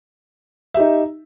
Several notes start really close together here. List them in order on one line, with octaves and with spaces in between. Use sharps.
E5 G4 D#4